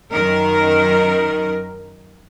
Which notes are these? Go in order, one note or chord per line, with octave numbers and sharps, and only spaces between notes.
F#2 D#3 A#4